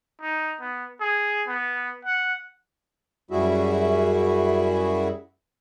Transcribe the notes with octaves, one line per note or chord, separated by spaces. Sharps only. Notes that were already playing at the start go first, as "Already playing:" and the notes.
D#4
B3
G#4
B3
F#5
F#2 G3 E4 F#4 G#4 E5